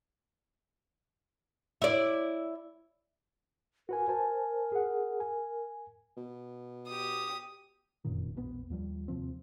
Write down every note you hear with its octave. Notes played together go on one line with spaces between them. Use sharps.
E4 D5
F#4 A#4 B4 G#5
C5 G#5 A5
G#4 F#5
G#5
B2
G4 D#6
F1 F#2 A#2 D#3
E1 A#1 G#2 B3
D#2 F3 G3
D#2 C3 F3 C4